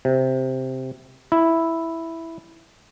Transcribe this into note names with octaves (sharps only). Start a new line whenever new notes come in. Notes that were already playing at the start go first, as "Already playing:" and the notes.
C3
E4